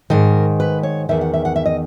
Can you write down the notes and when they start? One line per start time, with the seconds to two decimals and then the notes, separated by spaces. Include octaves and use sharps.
0.10 G#2 D#3 A#4
0.60 B4
0.83 C#5
1.09 E2 D#3 E5
1.21 F#5
1.34 E5
1.45 F#5
1.56 E5
1.66 D#5